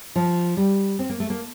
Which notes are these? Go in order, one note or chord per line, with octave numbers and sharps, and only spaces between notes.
F3
G3
C4
A#3
A3
A#3